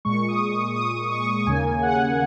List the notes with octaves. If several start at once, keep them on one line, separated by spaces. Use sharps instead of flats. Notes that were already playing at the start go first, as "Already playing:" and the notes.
A#2 G#3 C#6
D#6
D#6
D#6
C#6
D#2 C#3 A#3 G#5
F#5